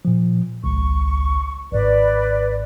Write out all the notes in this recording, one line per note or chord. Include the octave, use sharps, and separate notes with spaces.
A#2 F3
G#1 C#2 C#6
G#1 G#2 B4 D5